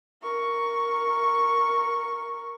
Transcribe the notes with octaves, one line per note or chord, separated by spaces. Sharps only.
A#4 C#6